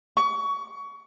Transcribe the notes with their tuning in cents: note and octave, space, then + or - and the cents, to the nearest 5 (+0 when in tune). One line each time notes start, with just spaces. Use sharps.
C#6 +25